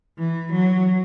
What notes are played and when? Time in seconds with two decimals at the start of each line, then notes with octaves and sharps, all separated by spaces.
0.18 E3
0.53 F#3